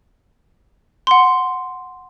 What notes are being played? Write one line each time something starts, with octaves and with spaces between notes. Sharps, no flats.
F#5 C6